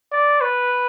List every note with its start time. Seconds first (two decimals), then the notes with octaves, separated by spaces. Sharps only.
0.12 D5
0.41 B4